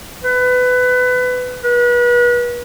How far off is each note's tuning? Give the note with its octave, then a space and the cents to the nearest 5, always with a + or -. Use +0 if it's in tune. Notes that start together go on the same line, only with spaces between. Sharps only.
B4 +20
B4 -35